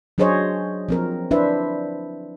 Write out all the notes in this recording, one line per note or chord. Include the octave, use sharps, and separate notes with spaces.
F#3 D4 G#4 C5 C#5 D#5
F3 C4 A#4
D4 E4 B4 C5 E5